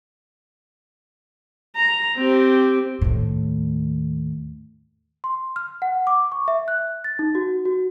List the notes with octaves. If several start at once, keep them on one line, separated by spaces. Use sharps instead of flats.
A#5
C4 G4
D#2 A2
C6
F6
F#5
D6
C#6
E5
F#6
A6
D#4
F#4
F#4